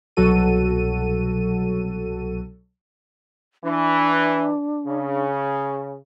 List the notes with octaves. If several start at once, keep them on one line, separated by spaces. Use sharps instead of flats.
C2 B2 F#3 F#4 A4 D#7
E3 D4
C#3